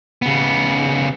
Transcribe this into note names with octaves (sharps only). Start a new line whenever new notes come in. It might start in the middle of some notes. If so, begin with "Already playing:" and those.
C#3 B3